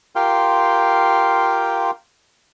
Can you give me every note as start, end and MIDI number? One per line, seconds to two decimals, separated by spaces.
0.15 1.91 65
0.15 1.91 67
0.15 1.91 70
0.15 1.91 77
0.15 1.91 79
0.15 1.91 84